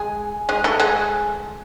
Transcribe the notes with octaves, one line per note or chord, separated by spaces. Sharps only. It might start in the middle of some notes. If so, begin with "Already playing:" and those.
Already playing: G#3 G#4
G#3 G#4
A3 A4
G#3 G#4